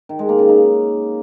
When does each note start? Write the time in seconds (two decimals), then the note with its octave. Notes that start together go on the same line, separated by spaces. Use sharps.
0.09 D#3
0.19 G#3
0.29 A#3
0.39 C#3
0.49 D#4